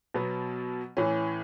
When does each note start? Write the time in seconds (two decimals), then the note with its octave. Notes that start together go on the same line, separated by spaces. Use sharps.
0.14 B2 F#3 B3
0.97 A2 E3 C#4